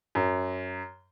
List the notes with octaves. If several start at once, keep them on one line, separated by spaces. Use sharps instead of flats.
F#2